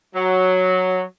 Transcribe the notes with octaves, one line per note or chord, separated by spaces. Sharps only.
F#3